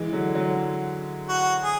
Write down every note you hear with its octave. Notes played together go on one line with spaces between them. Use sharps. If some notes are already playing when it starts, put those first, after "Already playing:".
Already playing: E3 G#3
D3 F#3
D3 F#3
F#4
G#4